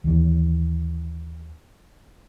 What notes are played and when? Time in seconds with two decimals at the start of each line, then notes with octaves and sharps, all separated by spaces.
0.04 D#2 E3